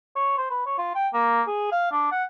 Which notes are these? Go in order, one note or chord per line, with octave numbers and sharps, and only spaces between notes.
C#5
C5
B4
C#5
F4
G5
A#3
G#4
F5
D4
F#5